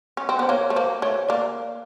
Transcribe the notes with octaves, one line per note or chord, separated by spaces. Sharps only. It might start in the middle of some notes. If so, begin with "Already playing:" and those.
C#4
C4
B3 C5
A#3 C#5
A3
A#3 C5
A3 C#5
A#3 D5